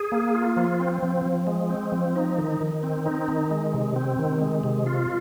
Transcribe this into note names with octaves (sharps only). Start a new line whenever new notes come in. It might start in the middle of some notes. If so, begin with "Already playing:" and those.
Already playing: G#4
A#3
F4
F3
C4
F3
F3
G#3
C4
F3
D#4
D#3
D#3
C4
D#4
D#3
G#3
C3
C4
D#3
G#3
C3
F4